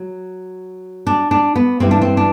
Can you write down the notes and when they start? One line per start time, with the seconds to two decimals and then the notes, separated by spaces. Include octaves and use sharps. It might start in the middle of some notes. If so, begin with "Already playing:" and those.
Already playing: F#3
1.07 D4
1.31 D4
1.55 B3
1.80 G2 E3 G3 C4
1.91 D4
2.02 C4
2.17 D4